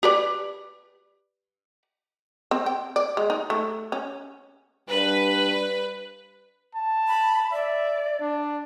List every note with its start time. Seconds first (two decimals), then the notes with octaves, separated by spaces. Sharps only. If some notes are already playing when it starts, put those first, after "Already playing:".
0.03 G4 B4 D5
2.51 C4
2.66 G5
2.96 D5
3.17 G#3
3.30 D#4
3.50 A3
3.92 C#4
4.89 G2 B4
6.75 A5
7.08 B5
7.52 D5 E5
8.20 D4